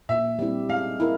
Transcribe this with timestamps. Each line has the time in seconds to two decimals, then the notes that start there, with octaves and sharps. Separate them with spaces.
0.09 A#2 E5
0.39 G3 C4 E4 G4
0.69 G#3 F5
1.00 E4 A#4